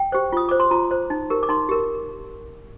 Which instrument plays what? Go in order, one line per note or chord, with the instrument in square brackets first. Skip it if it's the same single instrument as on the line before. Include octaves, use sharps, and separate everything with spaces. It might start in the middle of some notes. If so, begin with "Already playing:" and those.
Already playing: [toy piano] G5
G4 C5
F4 D#6
C5 D6
C6
F4 A#5
C5
D#4
G4 A#4
D6
D#4 C6
G4 A#4